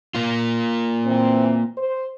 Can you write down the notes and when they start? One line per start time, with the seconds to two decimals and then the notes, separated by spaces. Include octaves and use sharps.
0.15 A#3 F4
1.06 E3 C4
1.77 C5